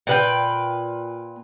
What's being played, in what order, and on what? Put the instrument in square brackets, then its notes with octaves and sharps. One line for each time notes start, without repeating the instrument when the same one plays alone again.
[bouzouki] A#2 B4 G5